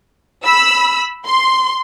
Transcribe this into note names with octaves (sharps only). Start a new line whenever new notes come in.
B5 E6
C6